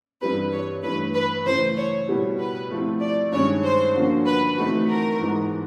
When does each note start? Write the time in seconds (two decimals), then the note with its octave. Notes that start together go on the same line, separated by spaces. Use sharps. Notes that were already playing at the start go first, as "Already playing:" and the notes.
0.21 G2 E3 G3 C4 B4
0.52 C#5
0.83 G2 E3 A3 B4
1.14 B4
1.46 C#3 E3 A3 C5
1.77 C#5
2.08 B2 G3 B3 E4 G4
2.39 B4
2.70 F3 A3 C4 E4
3.01 D5
3.32 G2 D#3 G#3 C#4 C#5
3.63 C5
3.95 D3 F3 A#3 C#4 F#4
4.26 B4
4.57 E3 A3 C4 D#4 F#4 B4
4.88 A#4
5.20 G#2 E3 G#3 B3